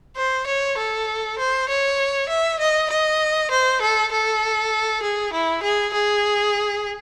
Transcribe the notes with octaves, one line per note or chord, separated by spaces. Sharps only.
C5
C#5
A4
C5
C#5
E5
D#5
D#5
C5
A4
A4
G#4
E4
G#4
G#4